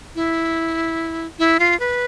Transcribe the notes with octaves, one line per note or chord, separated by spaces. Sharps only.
E4
E4
F4
B4